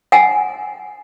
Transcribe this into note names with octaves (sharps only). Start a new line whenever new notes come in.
F#5 G#5